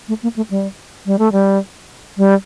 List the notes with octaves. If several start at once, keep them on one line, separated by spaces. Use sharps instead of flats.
A3
A#3
A3
G3
G3
A3
G3
G3